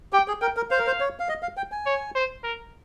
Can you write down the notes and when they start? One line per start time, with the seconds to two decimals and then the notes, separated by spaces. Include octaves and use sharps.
0.13 G4 G5
0.28 G#4
0.41 A#4 G5
0.57 A#4
0.71 C5 F5
0.78 A#4
0.87 C5
1.00 C#5
1.19 F5
1.29 D#5
1.42 F5
1.57 G5
1.72 G#5
1.86 C#5
2.15 C5
2.44 A#4